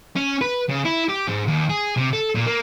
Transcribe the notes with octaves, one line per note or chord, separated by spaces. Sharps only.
C#4
B4
C#3
E4
G4
G#2
D#2
G#4
C3
A4
A#2
A#3